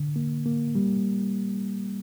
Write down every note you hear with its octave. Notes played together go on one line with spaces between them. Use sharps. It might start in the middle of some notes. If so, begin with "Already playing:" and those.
Already playing: D3
A#3
A#3
G3